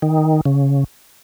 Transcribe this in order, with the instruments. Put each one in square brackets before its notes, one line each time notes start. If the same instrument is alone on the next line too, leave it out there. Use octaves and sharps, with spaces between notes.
[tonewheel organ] D#3
C#3